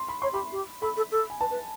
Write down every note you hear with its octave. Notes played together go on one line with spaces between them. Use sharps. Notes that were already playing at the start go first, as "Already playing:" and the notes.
Already playing: C6
B5
C#5 C6
G4 B5
G4
A4 B5
A4
A4
G#5
B4 A5
B4